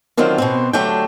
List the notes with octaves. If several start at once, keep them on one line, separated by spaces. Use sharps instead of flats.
D3 D#3 F#3 C4 F4
B2 B3 C4
D2 F#3 A3 D4 G4 G5